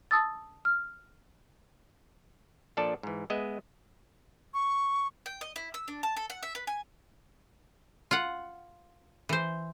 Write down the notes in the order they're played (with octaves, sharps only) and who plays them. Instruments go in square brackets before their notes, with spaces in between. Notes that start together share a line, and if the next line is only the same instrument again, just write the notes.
[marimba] A5 D#6 E6 A6
F6
[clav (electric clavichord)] A#2 F3 D4 A4 D5 A5
G#2 E3
G#3 B3 D#5 E5
[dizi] C#6
[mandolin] G5
D#5
E4
E6
D4
A5
A4
F#5
E5
B4
G#5
[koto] F4 F#5
E3 C5